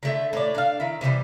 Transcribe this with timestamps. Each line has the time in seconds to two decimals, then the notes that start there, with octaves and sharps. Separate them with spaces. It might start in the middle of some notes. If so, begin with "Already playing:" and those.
0.03 D3 A3 E5
0.33 A2 C#5 D5
0.55 D4 F5
0.80 D#3 E4
1.01 C3 E3 F3 G3